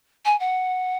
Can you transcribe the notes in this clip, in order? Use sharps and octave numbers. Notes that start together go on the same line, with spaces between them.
G#5
F#5